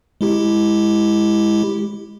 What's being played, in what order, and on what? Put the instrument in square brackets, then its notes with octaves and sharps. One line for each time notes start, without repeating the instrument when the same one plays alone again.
[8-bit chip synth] G#3 E4 G4